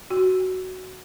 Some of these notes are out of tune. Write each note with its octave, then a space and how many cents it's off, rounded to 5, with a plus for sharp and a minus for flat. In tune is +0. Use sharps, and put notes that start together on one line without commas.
F#4 +5